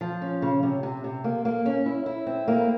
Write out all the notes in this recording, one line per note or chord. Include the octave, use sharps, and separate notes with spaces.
F3
C#4
C#3
C3
C3
C3
A#3
A#3
C#4
E4
E4
C4
A#3